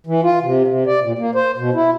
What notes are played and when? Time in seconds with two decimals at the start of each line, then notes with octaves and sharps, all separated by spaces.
0.06 E3
0.23 F4
0.42 C3
0.68 C3
0.86 D5
1.03 A#2
1.19 A#3
1.35 C5
1.58 B2
1.74 E4